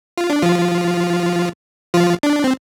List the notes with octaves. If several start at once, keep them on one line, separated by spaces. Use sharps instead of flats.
F4
D4
F3 F4
F3 F4
D4
C4